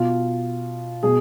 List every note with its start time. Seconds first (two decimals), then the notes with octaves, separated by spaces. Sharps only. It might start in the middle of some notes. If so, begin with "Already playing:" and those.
Already playing: B2 F4
1.03 B2 G#4